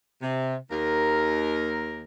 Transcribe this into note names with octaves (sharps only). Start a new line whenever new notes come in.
C3
D#2 A#4